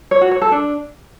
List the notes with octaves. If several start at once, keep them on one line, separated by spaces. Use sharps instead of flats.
C#5
F#4
C#5
A4
D4